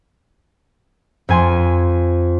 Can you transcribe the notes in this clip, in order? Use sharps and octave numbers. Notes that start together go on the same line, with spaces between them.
F2 G#5 C6